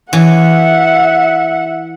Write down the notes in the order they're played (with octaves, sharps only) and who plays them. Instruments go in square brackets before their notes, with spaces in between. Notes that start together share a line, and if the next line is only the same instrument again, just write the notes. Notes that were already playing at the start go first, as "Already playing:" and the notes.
[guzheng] E3 [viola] E5 F#5